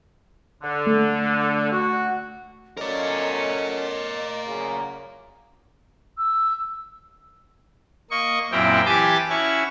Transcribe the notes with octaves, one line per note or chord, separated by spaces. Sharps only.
D3
A3
F#4
F#3 A3 C#4 A#4 D5 D#5
F#2 A#2 C#3
E6
A#3 D#5 C#6
F#2 A#2 C4 E4 A#4 G5
E3 G4 G#5 A5 D6
C#4 E4 F#4 C#6